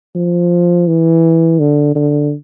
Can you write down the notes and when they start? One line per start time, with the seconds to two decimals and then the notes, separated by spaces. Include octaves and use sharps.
0.15 F3
0.88 E3
1.59 D3
1.95 D3